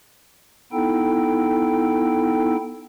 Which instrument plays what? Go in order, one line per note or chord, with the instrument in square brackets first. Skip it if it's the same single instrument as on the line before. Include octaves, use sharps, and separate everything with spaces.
[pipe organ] B3 D#4 E4 A4 G5